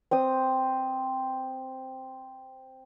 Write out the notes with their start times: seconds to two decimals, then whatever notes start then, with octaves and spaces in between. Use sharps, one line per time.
0.11 C4 C5 D#6